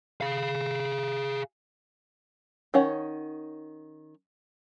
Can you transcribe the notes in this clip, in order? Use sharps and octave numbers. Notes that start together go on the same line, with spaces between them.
G#4 F5
D#3 C#4 C#5 F#5